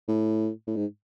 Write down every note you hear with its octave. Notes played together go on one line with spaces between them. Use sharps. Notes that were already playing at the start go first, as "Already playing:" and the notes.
A2
A2
G#2